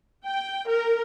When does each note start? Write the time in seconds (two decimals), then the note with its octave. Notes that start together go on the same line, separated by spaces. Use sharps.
0.24 G5
0.67 A#4